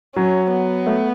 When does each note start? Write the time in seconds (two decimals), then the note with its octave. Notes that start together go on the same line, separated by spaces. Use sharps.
0.16 F#3 C#4
0.51 B3
0.86 A3